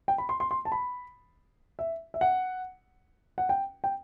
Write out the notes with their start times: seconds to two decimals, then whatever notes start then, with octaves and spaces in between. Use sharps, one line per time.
0.08 G5
0.18 B5
0.29 C6
0.40 C6
0.51 C6
0.65 A5
0.72 B5
1.79 E5
2.14 E5
2.21 F#5
3.38 F#5
3.49 G5
3.84 G5